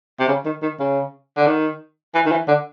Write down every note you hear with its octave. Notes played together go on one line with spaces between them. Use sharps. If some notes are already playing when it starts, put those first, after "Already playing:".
C3
C#3
D#3
D#3
C#3
D3
D#3
E3
D#3
E3
D3